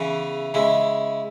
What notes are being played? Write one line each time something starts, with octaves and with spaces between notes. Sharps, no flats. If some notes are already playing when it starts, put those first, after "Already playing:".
Already playing: E2 C#3 E3
C#3 G#3 E4